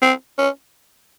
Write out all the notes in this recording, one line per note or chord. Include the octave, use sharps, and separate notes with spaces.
C4
C#4